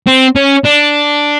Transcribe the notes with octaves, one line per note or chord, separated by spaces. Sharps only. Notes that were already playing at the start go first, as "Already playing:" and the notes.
C4
C#4
D4